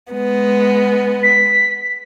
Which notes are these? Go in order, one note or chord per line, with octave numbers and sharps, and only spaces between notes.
G#3 B3
B6